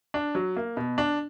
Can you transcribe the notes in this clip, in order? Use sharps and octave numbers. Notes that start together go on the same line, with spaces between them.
D4
F#3
A#3
B2
D4